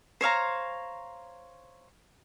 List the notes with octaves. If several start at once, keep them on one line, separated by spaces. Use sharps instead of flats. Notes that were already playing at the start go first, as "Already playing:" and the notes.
C5 C#5 F5 A#5